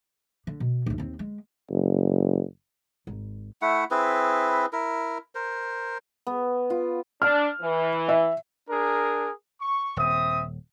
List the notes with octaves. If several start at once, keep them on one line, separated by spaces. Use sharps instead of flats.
D3
B2
D1 D2
D#2 C4
G#3
F#1
G#1
A3 E4 F#5
C4 E4 G#4 B4
E4 A#4
A#4 C5
B3
F4
D4 F6
E3
E5
D4 G#4 A#4
C#6
D#1 C4 E5 D#6